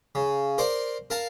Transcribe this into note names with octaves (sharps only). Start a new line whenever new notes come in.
C#3
A#4 C5 D5 C6
A#4 F5 A5 A#5